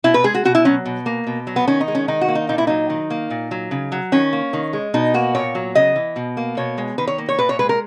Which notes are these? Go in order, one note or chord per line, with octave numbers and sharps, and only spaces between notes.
B2 E4
B4
G#3 G#4
F#4
B2 F#4
E4
F#3 C#4
B2
A#3
B2
F#3
B3
D#3 C#4
D#4
G#3
C#4
D#3 D#4
F#4
A#3
D#4
A#2 D#4
E4
F#3 D#4
D#3
A#3
A#2
F#3
C#3
F#3
D#3 C#4
A#3
D#3
G#3
B2 D#4
A#3 F#4
A#2 C#5
F#3
C#3 D#5
E3
B2
A#3
B2 C#5
G#3
D#3 B4
C#5
A#3
C#5
A#2 B4
C#5
G#3 B4
A#4